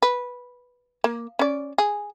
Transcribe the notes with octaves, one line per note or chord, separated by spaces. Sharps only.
B4
A#3
C#4 D5
G#4